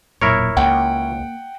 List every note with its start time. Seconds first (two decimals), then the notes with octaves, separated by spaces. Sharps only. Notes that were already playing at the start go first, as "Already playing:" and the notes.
0.22 E1 F#2 A#2 E4 A#4 C#5
0.57 C#2 A#3 F#5 G5